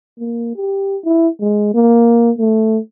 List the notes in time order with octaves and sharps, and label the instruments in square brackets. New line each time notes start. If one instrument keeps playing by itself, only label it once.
[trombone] A#3
G4
E4
G#3
A#3
A3